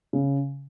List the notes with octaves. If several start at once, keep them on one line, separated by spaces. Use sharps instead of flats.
C#3